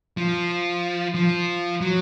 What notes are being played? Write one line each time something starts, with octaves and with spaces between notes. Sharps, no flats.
F3
F3
F#3